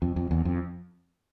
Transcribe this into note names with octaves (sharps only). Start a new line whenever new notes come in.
F2
F2
E2
F2